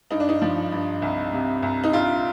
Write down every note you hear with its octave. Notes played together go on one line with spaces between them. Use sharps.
G2 D#4
D4
D#4
F3
G2
C2
C3
C2
D#4
A#1 F4